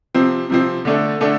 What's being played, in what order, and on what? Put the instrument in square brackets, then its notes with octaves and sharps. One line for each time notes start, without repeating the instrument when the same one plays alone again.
[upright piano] C3 F3 C4
C3 F3 C4
D3 A3 D4 A4
D3 A3 D4 A4